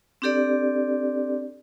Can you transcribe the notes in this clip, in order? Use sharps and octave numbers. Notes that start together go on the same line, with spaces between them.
C4 D4 G4 A4 D5